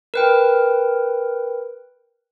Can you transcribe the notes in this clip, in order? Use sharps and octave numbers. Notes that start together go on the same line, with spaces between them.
A#4 B4 G5